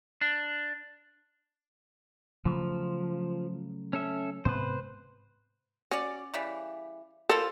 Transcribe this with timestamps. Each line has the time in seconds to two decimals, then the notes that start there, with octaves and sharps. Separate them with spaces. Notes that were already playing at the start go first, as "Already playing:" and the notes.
0.21 D4
2.45 C#3 F3 F#3 A3
3.93 C#4 A4 E5
4.45 G#2 C3 B3 B4 C5
5.91 C#4 F#4 C#5 D5
6.34 C#3 E3 G3
7.29 C4 E4 F4 A4 A#4